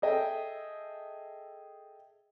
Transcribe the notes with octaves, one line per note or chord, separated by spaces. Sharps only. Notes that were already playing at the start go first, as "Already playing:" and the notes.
G#4 A4 D#5 E5 G5